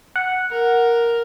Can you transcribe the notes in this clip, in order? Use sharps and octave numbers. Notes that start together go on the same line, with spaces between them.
F#5
A#4